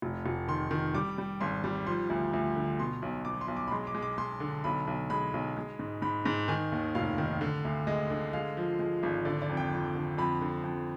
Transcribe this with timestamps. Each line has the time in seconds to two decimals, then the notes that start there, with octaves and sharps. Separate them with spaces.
0.02 F1
0.26 F1
0.48 D#3 C6
0.71 D#3
0.95 G3 D6
1.18 G3
1.41 G#1 C6
1.64 G3
1.87 F3 C6
2.10 D2
2.33 D2
2.56 D3
2.79 B2 C6
3.02 B1
3.25 B2 D6
3.41 C6
3.48 B1
3.57 D6
3.68 B5
3.71 G#3 C6
3.87 D6
3.95 G#3
4.02 D6
4.18 G#3 C6
4.40 D3
4.64 B1 B5
4.87 B1
5.10 G#3 B5
5.34 B1
5.57 G#3
5.79 G#2
6.02 G#2 B5
6.26 G#2
6.48 D#3 G#5
6.72 D#2
6.95 F1 F5
7.18 D#3
7.41 D3
7.65 D2
7.87 G#3 D#5
8.10 D3
8.33 G#3 F5
8.57 F3
8.79 G#3
9.03 G#1
9.25 D3 D5
9.42 D5
9.49 F2
9.57 G5
9.73 F2
9.95 D3
10.18 F2 B5
10.41 D3
10.64 F2